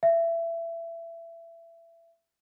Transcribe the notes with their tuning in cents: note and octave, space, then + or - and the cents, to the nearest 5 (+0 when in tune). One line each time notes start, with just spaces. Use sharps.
E5 +25